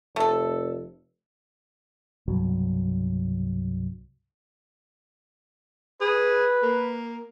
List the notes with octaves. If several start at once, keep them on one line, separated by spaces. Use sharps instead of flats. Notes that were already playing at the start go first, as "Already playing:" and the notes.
F1 A3 A4
C2 G2 B2 F#3
G#4 B4
A#3